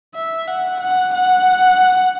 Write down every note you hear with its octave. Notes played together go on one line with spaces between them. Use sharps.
E5
F#5
F#5
F#5